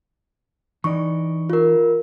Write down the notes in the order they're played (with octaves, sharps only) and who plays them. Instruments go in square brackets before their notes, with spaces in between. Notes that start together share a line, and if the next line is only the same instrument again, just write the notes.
[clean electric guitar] E3 D#4 D5 [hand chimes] C#6
[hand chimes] F4 A#4